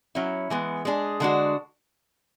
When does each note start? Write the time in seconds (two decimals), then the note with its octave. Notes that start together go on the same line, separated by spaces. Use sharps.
0.15 F#3 C#4 E4
0.50 E3 G#3 B3
0.85 G#3 D4 G#4
1.20 D3 G#3 D4 F#4